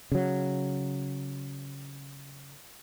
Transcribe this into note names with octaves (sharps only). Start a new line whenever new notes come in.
C#3 F#3